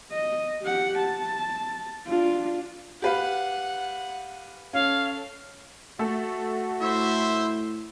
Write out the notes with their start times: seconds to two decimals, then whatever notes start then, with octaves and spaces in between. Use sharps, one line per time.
0.12 D#5
0.62 G4 F#5
0.99 A5
2.07 D4 F4
3.02 G4 B4 F5 F#5
4.73 C#4 A4 F5
5.99 A3 F#4 A4
6.81 A2 E4 C5 E5